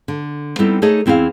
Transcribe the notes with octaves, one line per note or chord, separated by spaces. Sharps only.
D3
G3 B3 C4 D#4 E4 A4
A3 D#4 G#4 A4 C#5 D#5
E2 C4 E4 G#4 F5